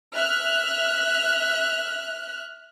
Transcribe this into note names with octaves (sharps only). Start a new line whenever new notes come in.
E5 F6 F#6